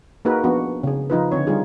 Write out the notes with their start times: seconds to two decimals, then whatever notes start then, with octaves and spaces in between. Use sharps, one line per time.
0.25 A#3 D#4 F#4 G#4 A#4 B4
0.44 F3 B3 D4 F#4
0.83 C#3 G#4
1.10 F3 D#4 F4 B4
1.32 D3 C4 C#5
1.47 G3 D#4 F4 G#4